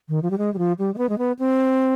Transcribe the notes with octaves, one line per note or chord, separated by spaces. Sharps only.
D#3
F3
G3
G#3
G3
F3
G3
G#3
B3
G#3
B3
C4